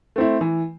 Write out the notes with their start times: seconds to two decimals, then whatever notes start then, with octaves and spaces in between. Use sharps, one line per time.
0.16 A3 C4 E4
0.41 E3